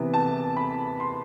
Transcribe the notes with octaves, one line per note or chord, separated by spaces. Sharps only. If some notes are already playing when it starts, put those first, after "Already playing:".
Already playing: C3 E3 B3
A5
B5
C6